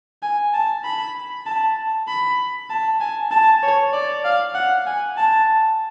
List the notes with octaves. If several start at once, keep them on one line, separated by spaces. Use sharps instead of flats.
G#5
A5
B5
A5
B5
A5
G#5
A5
C#5
D5
F5
F#5
G#5
A5